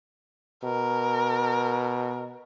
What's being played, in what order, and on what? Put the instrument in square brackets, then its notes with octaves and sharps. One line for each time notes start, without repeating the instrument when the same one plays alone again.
[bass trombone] B2 [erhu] A#4